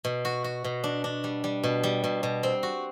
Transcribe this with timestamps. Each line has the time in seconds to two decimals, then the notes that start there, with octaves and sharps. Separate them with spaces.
0.05 B2
0.25 F#4
0.44 F#4
0.64 B2
0.84 D4
1.04 D4
1.24 G3
1.44 G3
1.64 B2
1.83 G3
2.04 B2
2.23 B2
2.43 C4
2.63 F#4